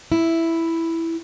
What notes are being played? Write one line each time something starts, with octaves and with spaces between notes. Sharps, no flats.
E4